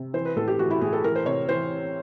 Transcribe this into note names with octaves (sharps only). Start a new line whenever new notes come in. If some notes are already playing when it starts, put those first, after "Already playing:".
Already playing: C3
E3 C5
B4
A2 A4
G4
E3 F#4
E4
A2 G#4
A4
E3 A#4
C5
C3 C#5
E3 C5